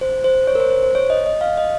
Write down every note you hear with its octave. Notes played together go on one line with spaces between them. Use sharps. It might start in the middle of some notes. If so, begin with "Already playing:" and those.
C5
C5
C#5
A#4
C5
C5
C5
C#5
D#5
D#5
F5
D#5